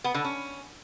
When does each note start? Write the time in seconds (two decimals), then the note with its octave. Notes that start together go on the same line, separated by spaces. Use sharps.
0.04 B3
0.14 D3
0.25 C#4